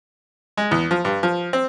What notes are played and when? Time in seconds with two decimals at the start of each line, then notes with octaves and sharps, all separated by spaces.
0.57 G#3
0.71 E2
0.91 F3
1.05 G2
1.23 F3
1.53 C4